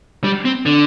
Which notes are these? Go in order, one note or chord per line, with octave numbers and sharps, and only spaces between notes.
G3
C4
D3